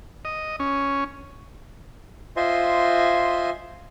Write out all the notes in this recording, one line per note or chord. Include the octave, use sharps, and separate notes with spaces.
D#5
C#4
F4 C5 D#5 E5 G#5 C6